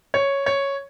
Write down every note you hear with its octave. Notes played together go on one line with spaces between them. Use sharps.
C#5
C#5